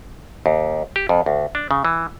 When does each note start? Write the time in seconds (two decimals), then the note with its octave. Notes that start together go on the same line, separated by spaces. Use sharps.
0.46 D#2
0.96 G4
1.09 F2
1.26 D2
1.55 D4
1.71 C#3
1.85 E3